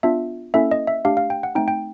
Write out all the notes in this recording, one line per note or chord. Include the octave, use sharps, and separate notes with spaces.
B3 D4 F4 E5
A#3 C#4 E4 A4 E5
D#5
E5
A3 D4 G4 F5
F5
G5
F#5
A3 C4 D#4 G5
G5